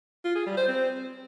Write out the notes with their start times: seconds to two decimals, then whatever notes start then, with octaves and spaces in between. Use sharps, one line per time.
0.25 F4
0.35 G#4
0.46 G3
0.57 C5
0.68 C4